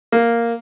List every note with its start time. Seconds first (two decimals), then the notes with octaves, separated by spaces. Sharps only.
0.12 A#3